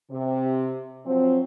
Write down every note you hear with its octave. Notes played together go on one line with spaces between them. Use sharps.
C3
F3 F#3 C4